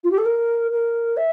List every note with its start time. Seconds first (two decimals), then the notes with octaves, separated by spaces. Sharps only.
0.04 F4
0.11 G4
0.18 A4
0.25 A#4
0.71 A#4
1.17 E5